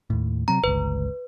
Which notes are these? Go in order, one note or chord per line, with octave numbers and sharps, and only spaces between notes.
D#2 A2
C3 F#3 C4 A#5
G1 C#2 B4